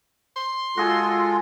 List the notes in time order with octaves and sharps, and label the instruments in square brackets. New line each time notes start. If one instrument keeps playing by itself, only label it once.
[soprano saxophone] C6
[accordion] G#3 F4 A4 [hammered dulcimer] F#4 G#4